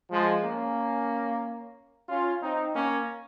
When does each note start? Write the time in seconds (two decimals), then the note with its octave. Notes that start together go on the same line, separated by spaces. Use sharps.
0.11 F3 G#3
0.44 A#3 C#4
2.09 C#4 F4
2.42 C4 D#4
2.75 A#3 C#4